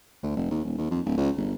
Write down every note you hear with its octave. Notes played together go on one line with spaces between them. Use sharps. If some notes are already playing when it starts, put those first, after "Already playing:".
D2
F1
D#2
D#1
D#2
F2
D1
C#2
G1